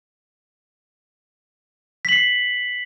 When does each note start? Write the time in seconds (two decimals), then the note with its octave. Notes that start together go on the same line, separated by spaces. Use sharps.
2.05 B6
2.09 F#7
2.12 C7